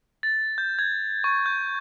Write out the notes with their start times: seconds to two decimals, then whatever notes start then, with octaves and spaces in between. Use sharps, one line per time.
0.23 A6
0.58 G6
0.79 G#6
1.24 C#6
1.46 G6